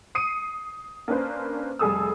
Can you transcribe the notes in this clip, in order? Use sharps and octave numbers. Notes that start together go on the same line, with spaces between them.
D#6 C7 C#7 D#7
A#3 C#4 D4 B4 C5
F1 G3 G#4 A4 D#6 E6